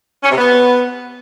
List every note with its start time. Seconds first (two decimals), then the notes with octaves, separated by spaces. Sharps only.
0.23 C#4
0.30 C3
0.37 B3